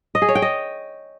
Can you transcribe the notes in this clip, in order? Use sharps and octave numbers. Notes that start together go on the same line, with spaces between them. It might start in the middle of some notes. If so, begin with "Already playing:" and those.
D#5
G#4
C#5
G5
D#5